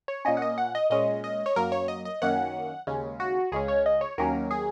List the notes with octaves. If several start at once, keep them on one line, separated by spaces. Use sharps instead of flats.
C#5
A#2 A#3 C#4 D#5
F#5
D#5
F#5
D#5
A#2 G#3 C#4 D#5
D#5
C#5
F#2 F#3 A#3 A#4
C#5
D#5
D#5
F#2 D#3 A#3 C#4 F#5
D#2 C#3 G#3 C#4
F#4
C#2 C#3 G#3 C#4 G#4
C#5
D#5
C#5
D#2 D#3 F#3 A#3 C#4 A#4
G#4